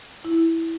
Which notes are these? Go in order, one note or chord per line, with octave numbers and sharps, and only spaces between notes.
E4